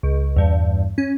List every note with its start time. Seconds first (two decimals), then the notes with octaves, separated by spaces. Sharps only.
0.03 C#2
0.36 E2 G2
0.98 C#4